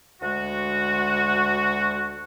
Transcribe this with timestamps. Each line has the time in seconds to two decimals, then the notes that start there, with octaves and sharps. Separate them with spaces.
0.22 D2 G#3 F#4